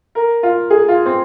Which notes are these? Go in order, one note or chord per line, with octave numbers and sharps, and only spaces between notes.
A#4
F4
G#4
F4
C4